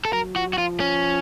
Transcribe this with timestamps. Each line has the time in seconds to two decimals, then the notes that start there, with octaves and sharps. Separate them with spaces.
0.05 A4
0.13 F#3 A#4
0.36 F3 F#4
0.47 F#3
0.53 F#4
0.58 F3 F4
0.80 C#4